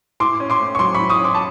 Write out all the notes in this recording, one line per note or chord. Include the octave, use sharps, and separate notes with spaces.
A2 C6 D6
C#4
C6 D6
A3
C#6
F#3 C6 D6
B5 C#6
A2
C#6 D#6
C#4
C6 D6
A5